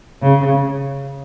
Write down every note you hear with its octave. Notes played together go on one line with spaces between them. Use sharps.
C#3